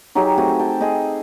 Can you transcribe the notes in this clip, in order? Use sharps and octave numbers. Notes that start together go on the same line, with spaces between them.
F#3 D#4 G4 G#4
A3 C4 F#4 G#4
G5 A5
G#4 A4 C5 D#5